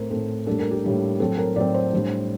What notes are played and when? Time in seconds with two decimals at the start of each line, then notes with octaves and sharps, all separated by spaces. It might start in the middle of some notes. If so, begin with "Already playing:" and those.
Already playing: A2 A3 C4 A#4 C5
0.10 A2 A3 C4 A4
0.46 A2 G3 A#3 D4 A4
0.59 A#4
0.71 G4
0.84 A2 G3 A#3 D4
1.20 A2 F#3 C4 A4
1.38 A#4
1.56 A2 F#3 C4 D5
1.74 C5
1.93 A2 G3 D4